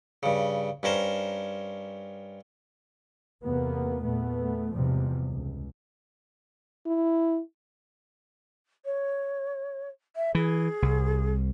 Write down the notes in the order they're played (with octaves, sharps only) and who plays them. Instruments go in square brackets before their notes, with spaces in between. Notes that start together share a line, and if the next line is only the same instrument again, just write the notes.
[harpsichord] G2 C#3
G2 C#4 A#4 C5
[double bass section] E2 C3 A#3 B3
E2 A#2 A3 B3
E2 G#2 C3 F3 G3
C#2
[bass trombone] E4
[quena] C#5
E5
[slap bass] E3 [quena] G#4
[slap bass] C2